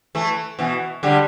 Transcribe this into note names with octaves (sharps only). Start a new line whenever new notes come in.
E3 A3
B2 E3
D3 G3